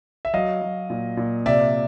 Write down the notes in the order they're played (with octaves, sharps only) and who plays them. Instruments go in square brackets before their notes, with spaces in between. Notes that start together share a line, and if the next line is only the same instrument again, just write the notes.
[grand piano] E5
F#3 D#5 F5
F#3
A#2
A#2
C3 D5 E5